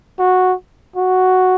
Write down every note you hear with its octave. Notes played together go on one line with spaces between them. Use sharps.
F#4
F#4